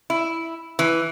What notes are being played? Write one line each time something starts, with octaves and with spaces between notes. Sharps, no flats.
E4
E3